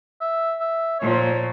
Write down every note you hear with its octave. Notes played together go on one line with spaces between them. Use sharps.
E5
E5
A#2 F3 C#5